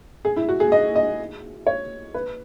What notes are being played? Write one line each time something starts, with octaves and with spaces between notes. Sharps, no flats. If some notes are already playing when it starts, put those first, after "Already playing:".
G#4
E4
F#4
G#4
D#5
D#5
C#5
B4